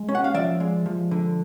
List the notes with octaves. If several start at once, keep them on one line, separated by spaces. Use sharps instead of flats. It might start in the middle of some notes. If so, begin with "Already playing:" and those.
Already playing: G#3
C#4
F#5
F5
F3 D5 E5
G#3
F3
D3